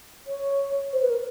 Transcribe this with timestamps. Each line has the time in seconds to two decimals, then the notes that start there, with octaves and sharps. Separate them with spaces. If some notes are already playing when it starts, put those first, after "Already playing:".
0.27 C#5
0.93 C5
1.02 B4
1.10 A#4